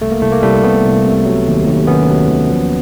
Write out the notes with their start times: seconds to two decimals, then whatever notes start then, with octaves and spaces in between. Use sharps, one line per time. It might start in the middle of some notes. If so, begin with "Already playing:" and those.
0.01 C2 A3
0.11 A#3
0.22 C2 A3
0.32 A#3
0.43 C2 G3 A3
0.63 C3 A3 B3
0.84 C2
1.05 C3
1.26 F#3
1.47 D#2
1.67 D#2
1.87 D#3 B3 C#4
2.09 F#3
2.29 D#2
2.49 F3